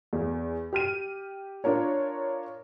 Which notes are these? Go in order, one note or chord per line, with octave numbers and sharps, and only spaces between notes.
E2
G4 F6 D#7
D4 F4 A#4 C#5